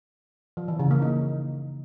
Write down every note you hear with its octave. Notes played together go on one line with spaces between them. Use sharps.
F3
E3
C#3
A#3
D#4